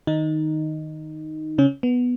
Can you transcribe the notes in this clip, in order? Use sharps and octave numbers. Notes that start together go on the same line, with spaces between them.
D#3 D#4
C#3 C#4
B3